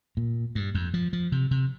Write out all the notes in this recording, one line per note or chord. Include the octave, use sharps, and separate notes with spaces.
A#2
G2
F2
F3
F3
C3
C3